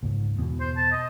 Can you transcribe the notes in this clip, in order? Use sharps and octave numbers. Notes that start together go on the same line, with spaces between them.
C#2 G#2
E2 B2
C5
A5
D#5